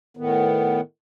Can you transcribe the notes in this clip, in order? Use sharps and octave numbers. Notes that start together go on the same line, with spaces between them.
A2 D#3 B3